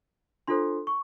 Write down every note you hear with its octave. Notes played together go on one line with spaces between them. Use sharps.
D4 F4 A4 C5 C6
C#6